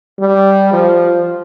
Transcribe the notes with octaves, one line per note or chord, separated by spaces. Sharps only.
G3
F3